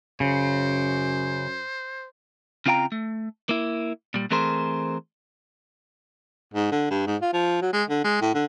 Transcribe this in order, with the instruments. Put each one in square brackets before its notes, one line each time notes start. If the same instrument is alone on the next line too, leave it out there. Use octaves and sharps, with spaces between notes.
[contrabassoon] F#2 [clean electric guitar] C#3 [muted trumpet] C5
[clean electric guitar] C#3 C4 F4 F5 G5 A#5
A3
A#3 E4
A#2 G3
E3 A3 C4 G#4 A#4 C5
[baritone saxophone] G#2
D3
G2
G#2
F4
F3
F#3
G#3
D3
G#3
A2
D3